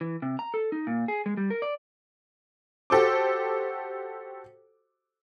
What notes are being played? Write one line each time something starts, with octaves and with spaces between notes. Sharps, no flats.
E3
C3
A#5
A4
D#4
A#2
G#4
G#3
G3
A#4
D5
F#4 G4 A4 C5 D6